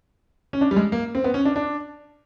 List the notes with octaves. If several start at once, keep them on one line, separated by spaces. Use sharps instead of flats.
C#4
D4
G3
G#3
A#3
C4
B3
C#4
D4
D4